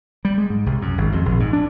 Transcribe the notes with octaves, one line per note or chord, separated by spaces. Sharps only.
G3
G#3
G#2
C2
F#2
G#1
F2
A#1
G#2
D4